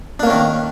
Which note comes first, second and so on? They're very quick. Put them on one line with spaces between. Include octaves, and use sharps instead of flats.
D4 A#3 C#4 D#3